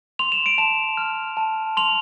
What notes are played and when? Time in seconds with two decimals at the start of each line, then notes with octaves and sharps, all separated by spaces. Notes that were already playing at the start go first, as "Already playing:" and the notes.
0.19 C6 F7
0.32 E7
0.46 D7
0.58 A5 E7
0.97 F6
1.37 A5
1.77 C6 F7